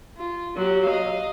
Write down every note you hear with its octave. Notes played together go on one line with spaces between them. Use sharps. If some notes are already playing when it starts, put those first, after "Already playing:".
F4
F#3 G4
D#5 F5